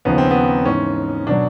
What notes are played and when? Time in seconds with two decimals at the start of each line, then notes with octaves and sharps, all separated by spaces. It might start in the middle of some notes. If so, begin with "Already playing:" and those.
0.05 D#2 C#3 F3 B3
0.18 C4
0.31 B3
0.65 G#2 E3 C#4
1.27 B2 F#3 D4